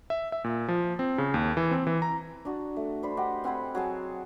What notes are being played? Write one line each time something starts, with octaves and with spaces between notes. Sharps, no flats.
E5
E5
A#2
F3
C4
C#3
D#2
E3
C4
E3
A#5
D4 F#4
A3
D4 C5 B5
G4 D#5 F#5
C4 F#5 G#5 B5
F#3 G#4 A5